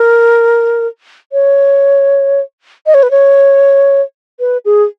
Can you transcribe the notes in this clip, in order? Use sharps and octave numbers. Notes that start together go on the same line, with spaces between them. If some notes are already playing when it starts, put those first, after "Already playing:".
Already playing: A#4
C#5
D#5
C#5
B4
C#5
B4
G#4